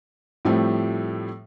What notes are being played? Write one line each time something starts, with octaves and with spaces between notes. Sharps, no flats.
A2 F3 G3 A3 C4